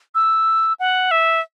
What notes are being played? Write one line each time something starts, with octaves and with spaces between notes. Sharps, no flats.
E6
F#5
E5